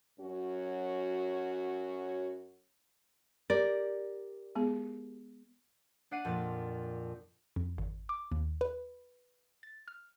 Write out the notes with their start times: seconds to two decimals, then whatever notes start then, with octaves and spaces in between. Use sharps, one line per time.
0.19 F#2 F#3 C#4 F#4
3.50 G4 A#4 D5
4.55 G#3 B3 G#4
6.11 D4 D5 F#5 C7 D#7
6.25 F2 A#2 A6
7.56 F2
7.78 G#1
8.09 D6
8.31 D#2
8.61 B4
9.63 A6
9.88 F6